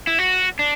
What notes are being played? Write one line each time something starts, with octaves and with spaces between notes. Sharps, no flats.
E4
F#4
D4